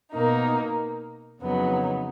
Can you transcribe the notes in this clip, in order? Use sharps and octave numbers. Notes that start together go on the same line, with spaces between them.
B2 A#3 D#4
F2 C#3 F#3 B3 D#4